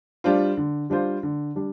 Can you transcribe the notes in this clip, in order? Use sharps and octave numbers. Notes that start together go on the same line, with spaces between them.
G3 D4 F4 C5
D3
G3 D4 F4 C5
D3
G3 D4